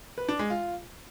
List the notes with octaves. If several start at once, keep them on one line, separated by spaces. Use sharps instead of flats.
B4
D4
G#3
F4